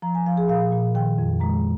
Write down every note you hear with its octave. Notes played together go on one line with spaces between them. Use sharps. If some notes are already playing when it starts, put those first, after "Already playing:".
F3 A#5
G#5
F3 F5
G#4
A#2 F5
A#2
D#3 G5
F2
G#3 A#5